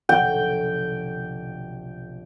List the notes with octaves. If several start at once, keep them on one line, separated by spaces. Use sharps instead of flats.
F1 B1 D3 G5